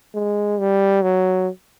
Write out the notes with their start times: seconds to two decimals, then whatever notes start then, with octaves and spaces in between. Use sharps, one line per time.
0.14 G#3
0.59 G3
1.02 F#3